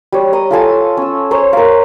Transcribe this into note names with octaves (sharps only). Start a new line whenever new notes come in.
G3 C#5
D#5 A#5 D#6
F4 A4 G#5 A5
C#4 E6
C5 C#5 G#5 A#5
A#4 F5